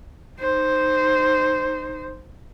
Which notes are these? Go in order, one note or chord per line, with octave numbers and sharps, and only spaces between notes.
D#4 C5